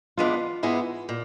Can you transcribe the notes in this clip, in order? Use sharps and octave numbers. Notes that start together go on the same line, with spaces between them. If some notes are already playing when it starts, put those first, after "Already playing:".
E3 G#3 B3 D4 F4
G#2 E3 G#3 B3 E4
A#2